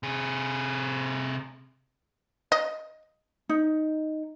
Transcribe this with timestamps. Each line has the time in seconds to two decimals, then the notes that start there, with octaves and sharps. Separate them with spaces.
0.03 C3 G#4
2.52 D#5
3.49 D#4